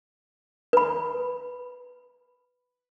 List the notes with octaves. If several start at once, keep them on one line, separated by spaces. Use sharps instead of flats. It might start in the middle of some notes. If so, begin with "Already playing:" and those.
B4 B5